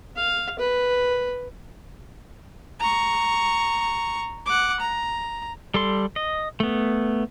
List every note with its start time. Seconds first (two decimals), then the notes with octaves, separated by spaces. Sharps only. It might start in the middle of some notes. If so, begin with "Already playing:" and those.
0.16 F5
0.59 B4
2.80 A#5 C#6
4.46 F#5 D6
4.81 A#5
5.74 G3 A4 C6
6.16 D#5
6.60 A3 B3